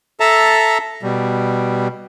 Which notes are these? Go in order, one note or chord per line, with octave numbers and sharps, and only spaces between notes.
A4 E5 A5 A#5
B2 G3